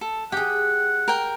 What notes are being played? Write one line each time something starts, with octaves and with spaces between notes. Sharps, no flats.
A4
G4 G#4 F#5 G5
A#4 G5